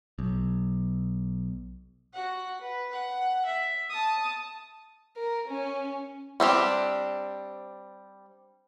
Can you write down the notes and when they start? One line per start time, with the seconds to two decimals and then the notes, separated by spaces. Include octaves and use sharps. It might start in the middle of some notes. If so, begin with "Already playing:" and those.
0.19 B1
2.13 F#4 F#5
2.61 B4
2.92 F#5
3.46 E5
3.90 A5 D#6
5.16 A#4
5.48 C#4
6.40 G3 C4 D4 G4